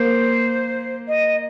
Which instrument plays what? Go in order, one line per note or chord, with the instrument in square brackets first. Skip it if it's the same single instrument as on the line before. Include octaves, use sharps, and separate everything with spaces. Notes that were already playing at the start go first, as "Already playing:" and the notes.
Already playing: [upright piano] A#3 [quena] C5
[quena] D#5